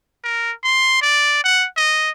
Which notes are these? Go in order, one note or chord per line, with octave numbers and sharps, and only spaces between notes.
A#4
C6
D5
F#5
D#5